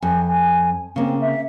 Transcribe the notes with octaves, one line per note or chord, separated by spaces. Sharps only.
F2 G#5
G#5
C#3 A#3 C4
E5